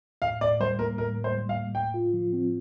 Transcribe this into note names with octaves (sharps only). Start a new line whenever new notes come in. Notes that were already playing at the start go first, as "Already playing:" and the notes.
A2 F5
A2 D5
G3 C5
A#3 A#4
A2 A#4
A2
C5
G3
F5
A#3
A2 G5
F4
F3
C4